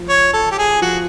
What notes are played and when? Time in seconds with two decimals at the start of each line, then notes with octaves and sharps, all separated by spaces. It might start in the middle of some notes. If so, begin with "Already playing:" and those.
Already playing: F3
0.09 C#5
0.33 A4
0.51 G4
0.58 G#4
0.82 F3 F#4